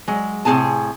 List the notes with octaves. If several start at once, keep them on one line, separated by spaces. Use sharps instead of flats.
F#3 G#3
A2 C3 D#4 G#4 G#5 A5